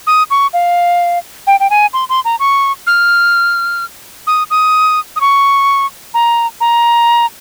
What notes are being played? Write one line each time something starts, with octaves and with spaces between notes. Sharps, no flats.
D#6
C#6
F5
G5
G5
G#5
C6
C6
A#5
C#6
F6
D#6
D#6
D#6
C#6
A#5
A#5